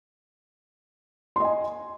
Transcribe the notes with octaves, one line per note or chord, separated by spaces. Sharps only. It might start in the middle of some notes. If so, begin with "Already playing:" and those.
D#5 G#5 C6